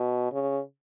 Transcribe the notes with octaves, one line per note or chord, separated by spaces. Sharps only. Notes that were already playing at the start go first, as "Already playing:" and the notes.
Already playing: B2
C#3